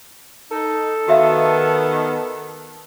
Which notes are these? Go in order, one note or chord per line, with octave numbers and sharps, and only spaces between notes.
D#4 A4
D#3 B3 F#4 E5 F5